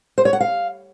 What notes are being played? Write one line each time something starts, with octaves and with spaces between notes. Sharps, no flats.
C5
C#5
F#5
F5